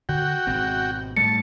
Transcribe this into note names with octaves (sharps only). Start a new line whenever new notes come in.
D3 F#4 G5
G#1 B2 C4
A2 G3 A3 A5 C#7